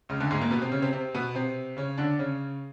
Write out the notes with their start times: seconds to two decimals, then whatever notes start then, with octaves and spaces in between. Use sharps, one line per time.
0.09 C#2 C#3
0.20 D2 D3
0.31 G#2 G#3
0.40 A#2 A#3
0.51 B2 B3
0.61 C3 C4
0.72 C#3 C#4
0.82 C3 C4
0.93 C3 C4
1.14 B2 B3
1.35 C3 C4
1.77 C#3 C#4
1.98 D3 D4
2.19 C#3 C#4